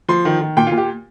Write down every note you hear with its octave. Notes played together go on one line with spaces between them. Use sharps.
F3 C6
D#3
D#3
A#2 G5
F4
A#2
G4